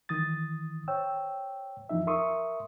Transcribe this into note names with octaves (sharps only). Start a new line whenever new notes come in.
D#3 E3 D#6 A6
C5 C#5 G5 E6
F2 E3 F3 D#4 E5
A#4 E5 C6 C#6 D#6